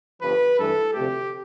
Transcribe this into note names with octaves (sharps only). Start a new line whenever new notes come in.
G1 G2 F3 B4
G2 E3 A3 A4
D2 C3 F3 A3 G4